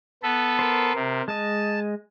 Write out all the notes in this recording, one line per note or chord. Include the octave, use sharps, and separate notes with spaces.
B3 A4 B4
A#4 C5
C3
G#3 D#5 A5